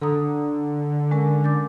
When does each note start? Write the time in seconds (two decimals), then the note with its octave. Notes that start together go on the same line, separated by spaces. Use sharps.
0.01 D3 A4 A#5 D#6
1.11 G#3 C#4 A#4
1.44 D6 G6 A6